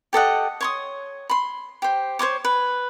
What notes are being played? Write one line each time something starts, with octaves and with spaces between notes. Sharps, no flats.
G4 A4 D#5 F#5
C#5 C6 D#6
B5 C6
G4 C5
C5 C#5 C6 D6
B4